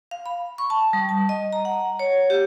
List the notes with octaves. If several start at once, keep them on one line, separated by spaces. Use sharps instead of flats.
F5
B5
C#6
A5
G3
A5
D#5
A#5
F#5
C#5
G4